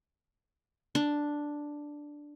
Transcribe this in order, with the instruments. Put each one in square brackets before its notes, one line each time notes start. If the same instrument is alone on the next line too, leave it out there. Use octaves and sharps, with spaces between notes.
[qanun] D4